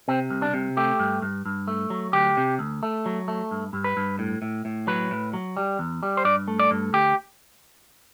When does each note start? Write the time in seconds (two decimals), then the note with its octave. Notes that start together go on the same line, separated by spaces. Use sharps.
0.08 C3 C4
0.30 C2
0.42 D4
0.54 C3
0.77 A3 G4
0.99 G2
1.22 G2
1.46 G2
1.67 A3
1.90 F#3
2.13 D2 G4
2.37 C3
2.59 D2
2.83 A3
3.06 F#3
3.28 A3
3.51 G2
3.73 G2
3.84 B4
3.97 G2
4.19 A2
4.42 A2
4.65 A2
4.87 F#3 B4
5.11 A2
5.33 F#3
5.57 G3
5.79 E2
6.03 G3
6.17 C5
6.25 G2 D5
6.48 A3
6.59 D5
6.71 G2
6.93 D2 G4